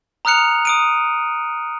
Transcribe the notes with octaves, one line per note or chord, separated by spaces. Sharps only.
A#5 D#6 F6 F#6 C#7 F7
D#6 D7 D#7